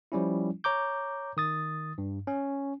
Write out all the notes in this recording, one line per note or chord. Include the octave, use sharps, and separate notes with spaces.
F3 G3 C#4 E4
C#5 A#5 D6 G6
D#3 D#6 A6
G2
C#4